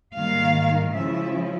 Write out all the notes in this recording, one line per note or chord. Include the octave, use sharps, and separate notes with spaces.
G#2 D#3 G3 A#3 F5
C#3 F3 G#3 C#4 E4 E5